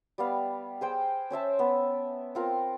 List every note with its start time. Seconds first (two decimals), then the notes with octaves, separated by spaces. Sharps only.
0.18 G3 B3 F5
0.81 G#4 C5 G5
1.30 C#4 C5 E5 A5
1.59 B3
2.35 C4 F4 A#4